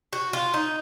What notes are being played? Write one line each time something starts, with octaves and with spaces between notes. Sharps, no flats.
F#4
F4
D#4